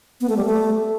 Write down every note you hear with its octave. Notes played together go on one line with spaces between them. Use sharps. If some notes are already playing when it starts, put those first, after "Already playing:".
B3
A3
G3
A3